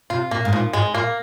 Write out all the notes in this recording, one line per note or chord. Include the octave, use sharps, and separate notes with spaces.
C3 F4
A#2 A#3
G#2
A#2 F3
G#2 G#3
A#2 A#3